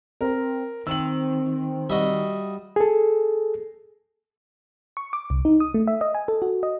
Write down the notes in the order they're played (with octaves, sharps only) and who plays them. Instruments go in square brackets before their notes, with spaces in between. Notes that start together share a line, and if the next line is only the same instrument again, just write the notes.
[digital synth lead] C4 [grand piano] A#4
[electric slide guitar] D#3 [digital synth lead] C4 [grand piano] E6 F#7
[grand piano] G3 [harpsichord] F#4 D#5 E5
[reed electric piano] G#4 A4
[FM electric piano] C#6
D6
C2
D#4
D#6
A3
E5
D#5
G#5
A4
F#4
D#5